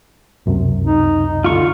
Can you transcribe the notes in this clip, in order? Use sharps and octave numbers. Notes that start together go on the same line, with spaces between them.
C#2 F#2 C3
D#4
D3 F4 C#6